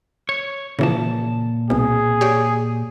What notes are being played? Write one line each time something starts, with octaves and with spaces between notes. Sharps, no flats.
C#5
A#2 C#3 E3 F3 A5
C2 B2 G#4
G4 C#5 D5